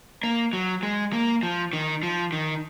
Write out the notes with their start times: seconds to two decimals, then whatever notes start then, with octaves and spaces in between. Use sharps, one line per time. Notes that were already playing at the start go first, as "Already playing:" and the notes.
0.23 A#3
0.53 F#3
0.83 G#3
1.13 A#3
1.43 F3
1.73 D#3
2.03 F3
2.32 D#3